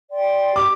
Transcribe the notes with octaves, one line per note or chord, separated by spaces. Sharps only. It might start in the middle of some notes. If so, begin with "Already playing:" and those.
D5 G5 C6
G4 D6